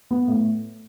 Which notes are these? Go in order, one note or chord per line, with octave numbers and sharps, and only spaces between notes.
B3
A2